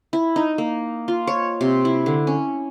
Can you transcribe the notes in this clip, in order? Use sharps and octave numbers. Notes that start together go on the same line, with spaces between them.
E4
D#4
A#3
F4
C#5
C3
E4
D3
C#4